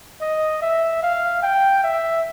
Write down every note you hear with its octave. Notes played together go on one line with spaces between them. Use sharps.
D#5
E5
F5
G5
E5